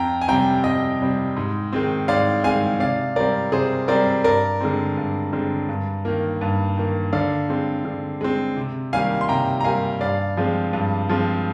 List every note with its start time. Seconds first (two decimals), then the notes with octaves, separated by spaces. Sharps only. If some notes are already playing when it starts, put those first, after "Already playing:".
Already playing: F2 G5 A#5
0.21 G#5
0.28 C3 G3 C4 G5 A#5
0.64 F2 D#5 G5
1.00 C3 G3 C4
1.37 G#2
1.73 D#3 G#3 C4
2.08 G#2 D5 F5
2.44 D#3 G#3 C4 F5 G#5
2.80 C3 D5 F5
3.16 G3 C4 A#4 D5
3.52 C3 G#4 C5
3.88 G3 C4 A#4 D5
4.24 G2 A#4 D5
4.61 D3 G#3 C4
4.97 G2
5.33 D3 G#3 C4
5.69 G2
6.05 D#3 A#3
6.41 G2
6.77 D#3 A#3
7.13 D3 D5 F5
7.49 G#3 C4
7.85 D3
8.21 G#3 C4
8.57 C3
8.93 D#3 G3 A#3 F5 G#5
9.21 C6
9.29 C3 G5 A#5
9.60 A#5
9.64 D#3 G3 A#3 F5 G#5
10.01 G2 D5 F5
10.37 F3 G#3 C4
10.73 G2
11.09 F3 G#3 C4